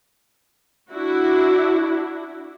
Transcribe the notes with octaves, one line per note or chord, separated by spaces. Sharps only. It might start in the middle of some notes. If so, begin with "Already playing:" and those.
D4 E4 F#4